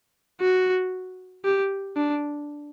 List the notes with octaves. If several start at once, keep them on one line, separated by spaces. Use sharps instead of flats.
F#4
G4
D4